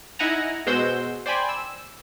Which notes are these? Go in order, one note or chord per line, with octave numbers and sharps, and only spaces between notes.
D#4 E4 F#5 G#5 A#5
B2 G#3 F#4 C5 E6 G6
C5 D5 G5 G#5 B5
E6